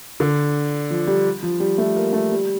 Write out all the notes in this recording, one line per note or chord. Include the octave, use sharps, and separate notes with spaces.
D3
F3
G3
F3
G3
A3
A#3
A3
G3